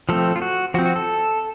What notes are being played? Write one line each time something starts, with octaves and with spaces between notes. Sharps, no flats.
F3 A3 C4 A4
F4
F#4
F3 C4 F#4
F#4
A4